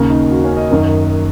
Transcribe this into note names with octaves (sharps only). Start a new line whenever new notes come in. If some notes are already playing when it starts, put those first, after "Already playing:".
Already playing: D#2 C#3 A#4
D#4
F#4
C#4
D#5
F#2 D#3 D#5